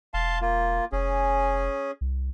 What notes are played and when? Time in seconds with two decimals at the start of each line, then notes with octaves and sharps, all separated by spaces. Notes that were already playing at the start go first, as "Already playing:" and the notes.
0.14 E1 F5 A5 C6
0.41 A#3 F4
0.92 F1 C#4 G#4
2.01 C2